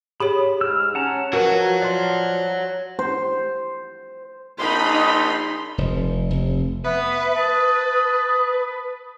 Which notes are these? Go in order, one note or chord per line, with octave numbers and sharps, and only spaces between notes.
G4 G#4 C#5 B5
G#2 E6 F6
C#4 F#5 A5 A#5
F3 F#4 A#4 B4 C#5 F#5
D5 F5 C6
C5
A#1 D#4 B5 C6
F1
F1
B3 B4 E5
A5 D#6